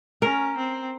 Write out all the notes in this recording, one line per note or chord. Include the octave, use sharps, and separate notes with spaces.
C#4 A#4
C4